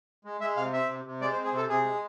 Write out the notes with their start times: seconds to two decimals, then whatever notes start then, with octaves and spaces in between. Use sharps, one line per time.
0.25 G#3
0.41 G#3 E5
0.57 C3 F5
0.73 C4 E5
0.89 C3
1.05 C3
1.21 G#3 D5
1.32 C5
1.37 C4
1.44 G#4
1.53 C3 A4
1.69 C3 G#4
1.84 G#3